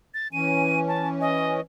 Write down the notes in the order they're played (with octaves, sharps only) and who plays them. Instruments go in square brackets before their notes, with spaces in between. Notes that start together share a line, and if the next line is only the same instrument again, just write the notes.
[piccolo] A6
[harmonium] E3 C#4 [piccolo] D#7
[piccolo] A5
D#5